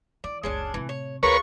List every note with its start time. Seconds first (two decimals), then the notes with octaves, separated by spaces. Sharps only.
0.24 E3 D5
0.43 F#1 C#2 G#3 C#4 D4
0.74 A2 C3 E3
0.89 C#5
1.23 D2 G#3 F4 A#4 B4 C#5 C#6